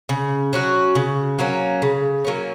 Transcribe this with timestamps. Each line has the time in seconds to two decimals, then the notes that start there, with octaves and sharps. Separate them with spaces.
0.09 C#3
0.53 F#3 C#4 F#4
0.95 C#3
1.39 F#3 A#3 C#4
1.82 C#3
2.24 F#3 A#3 C#4